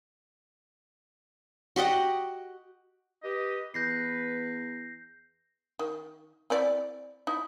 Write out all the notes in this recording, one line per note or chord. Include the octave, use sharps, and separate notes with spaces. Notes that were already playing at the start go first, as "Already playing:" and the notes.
F#4 G4 D#5 F#5
G4 B4 D#5
E2 B4 G6 A#6 C7
D#3
C4 E4 D5
D#4 E4